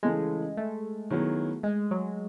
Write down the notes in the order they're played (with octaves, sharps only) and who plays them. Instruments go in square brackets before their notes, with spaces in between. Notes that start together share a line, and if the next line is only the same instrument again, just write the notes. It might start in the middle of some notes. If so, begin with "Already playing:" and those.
[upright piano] C#3 E3 A3 [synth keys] G#3
[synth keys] A3
[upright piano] D#3 F#3 B3 E4 G#4
[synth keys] G#3
F#3